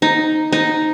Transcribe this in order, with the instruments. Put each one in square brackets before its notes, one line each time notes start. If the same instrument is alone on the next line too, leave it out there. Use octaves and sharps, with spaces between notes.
[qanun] D#4
D#4